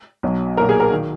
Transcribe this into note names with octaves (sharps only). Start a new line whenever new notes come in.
B1 B2 F#3
B1 A#2 F#3 A#4
G#4
A#4
D#3